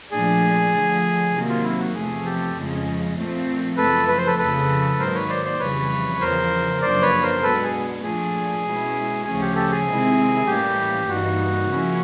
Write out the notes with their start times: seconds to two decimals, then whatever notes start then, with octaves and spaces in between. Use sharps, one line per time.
0.11 A#2 F3 A3 D4 G#4
0.73 D3 F3 A3
1.34 C3 D#3 F#3 A#3
1.49 F4
1.64 E4
1.79 F#4
1.94 E2 C3 F3 A3 G#4
2.25 G4 A4
2.55 F2 C#3 F3 G#3 C#4
3.17 A#2 F3 A3 C4
3.77 F#2 C#3 F3 A3 A4 B4
4.08 B4
4.18 C5
4.27 A4 B4
4.38 F2 C#3 F3 A4 B4
4.99 G#2 D#3 F#3 A#3 A#4 C5
5.14 B4 C#5
5.29 C5 D5
5.45 C5 D5
5.59 F2 C#3 E3 G3 B4 C#5
6.21 E2 C#3 F3 A#4 C5
6.82 F#2 C#3 F3 A#3 D4 C5 D5
7.02 B4 C#5
7.22 A#4 C5
7.43 B2 G#3 B3 D4 A4 B4
7.63 G#4
8.03 A#2 F3 A3 D4 G#4
8.64 B2 G#3 C#4 E4
9.25 D2 C#3 F3 A3 C#4 G#4
9.41 G4
9.55 G4 A4
9.71 G#4
9.86 C3 D#3 G#3 C4 E4
10.47 A2 E3 G3 A#3 C#4 G4
11.08 G2 E3 G3 A#3 D#4 F#4
11.69 C#3 F3 A#3 C#4 E4